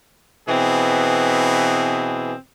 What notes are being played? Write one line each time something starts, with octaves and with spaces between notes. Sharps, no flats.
B2 E3 C4 G#4